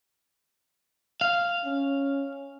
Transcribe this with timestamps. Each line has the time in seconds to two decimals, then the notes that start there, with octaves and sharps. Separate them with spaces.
1.21 F5
1.65 C#4